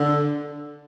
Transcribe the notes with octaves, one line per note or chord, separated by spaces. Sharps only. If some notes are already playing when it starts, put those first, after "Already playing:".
Already playing: D3